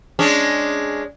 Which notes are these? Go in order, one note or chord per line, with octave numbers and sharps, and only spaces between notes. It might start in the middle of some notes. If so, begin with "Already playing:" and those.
G#3 C#4 D4